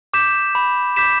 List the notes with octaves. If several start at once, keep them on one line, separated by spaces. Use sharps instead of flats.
D6 G6 B6 E7
B5
D6 G6 B6 E7